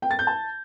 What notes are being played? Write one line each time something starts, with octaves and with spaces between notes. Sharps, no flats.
G5
A6
G6
A5